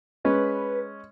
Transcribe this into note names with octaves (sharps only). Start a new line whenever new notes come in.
G#3 C#4 B4